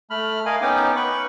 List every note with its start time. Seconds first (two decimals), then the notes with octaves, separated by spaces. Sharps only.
0.10 A3 B5 F6
0.46 A#4 D#5 F5 G#5
0.61 B3 C#4 D#4 G5 D6
0.96 B4 B5 C#6